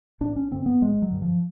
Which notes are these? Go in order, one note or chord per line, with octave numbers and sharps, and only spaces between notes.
A1 D4
C#4
G2 D3 C4
B3
A1 G#3
F#3
G2 D3
F3